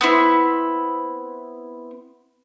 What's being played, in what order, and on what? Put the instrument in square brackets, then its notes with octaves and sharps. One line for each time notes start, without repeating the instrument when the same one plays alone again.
[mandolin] B3 C4 E4